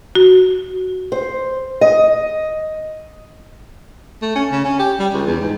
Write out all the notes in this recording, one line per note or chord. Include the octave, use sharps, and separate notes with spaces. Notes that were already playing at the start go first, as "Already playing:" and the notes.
F#4
C5
D#5
A3
C#4
C#3
C#4
G4
G3
C#2
E2
G#2